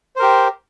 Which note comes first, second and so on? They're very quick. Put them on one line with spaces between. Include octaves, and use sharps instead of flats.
C5 A#4 G4